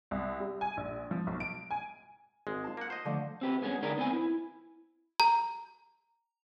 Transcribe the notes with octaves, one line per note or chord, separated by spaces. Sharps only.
C2
G3
G#5
A#1
F3
B1
D7
G#5
G#1 G#3
F4 A5
A#3 F#5
C5 D#5
D3 F3 A3
C4 G4 B4
G2 G#3 B3 C#4 G#4
D3 D#4 G#4 A#4 B4 D5
B3 C4 B4 G#5
E4
A#5